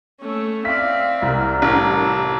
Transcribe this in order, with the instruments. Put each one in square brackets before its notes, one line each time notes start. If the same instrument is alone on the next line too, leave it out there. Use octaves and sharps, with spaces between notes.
[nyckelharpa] A3 C#4
[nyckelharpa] C4 D5 [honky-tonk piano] E5 B6 [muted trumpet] F5
[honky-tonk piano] C2 [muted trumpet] A#4
[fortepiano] A1
[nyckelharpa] F4 E5